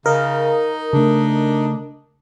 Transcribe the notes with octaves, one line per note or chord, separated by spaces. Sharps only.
C#3 D#4 A#4 D#5
C#3 A3 D4